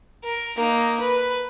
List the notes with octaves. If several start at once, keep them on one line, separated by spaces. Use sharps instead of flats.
A#4
A#3 D#4
B4